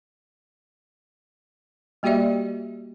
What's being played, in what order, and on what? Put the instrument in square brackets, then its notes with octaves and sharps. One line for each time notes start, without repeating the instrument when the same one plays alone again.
[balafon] G3 A#3 F#4 G4 D5 E5